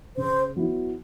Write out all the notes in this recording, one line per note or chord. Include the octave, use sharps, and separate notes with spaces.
C#3 C5
F#3 B3 E4